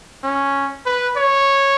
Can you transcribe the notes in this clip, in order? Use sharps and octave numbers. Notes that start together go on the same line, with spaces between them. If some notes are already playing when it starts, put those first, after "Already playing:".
C#4
B4
C#5